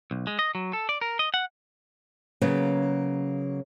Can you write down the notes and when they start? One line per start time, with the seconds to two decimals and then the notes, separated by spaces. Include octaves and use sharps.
0.11 B1
0.27 G#3
0.39 D#5
0.55 F#3
0.73 A4
0.89 D5
1.01 A#4
1.19 D#5
1.34 F#5
2.41 C#3 F#3 A#3 B3 C#4